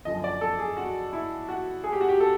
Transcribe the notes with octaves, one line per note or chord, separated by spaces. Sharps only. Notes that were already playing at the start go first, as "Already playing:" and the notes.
F#2 D3 F3 D#5
D5
A4
G#4
F#4
E4
F#4
G#4
G4
F#4
G4
A4